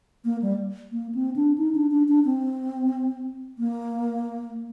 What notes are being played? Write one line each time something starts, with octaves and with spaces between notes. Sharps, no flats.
A#3
G3
A#3
C4
D4
D#4
D4
D4
D4
C4
A#3